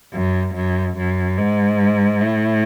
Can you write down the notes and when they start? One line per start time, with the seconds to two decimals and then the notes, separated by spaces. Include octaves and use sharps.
0.14 F#2
0.55 F#2
0.97 F#2
1.38 G#2
2.21 A2